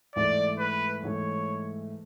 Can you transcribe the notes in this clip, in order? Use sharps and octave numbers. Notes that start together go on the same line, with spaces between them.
G#2 E3 A3 D5
B4
G#2 E3 A3 C#5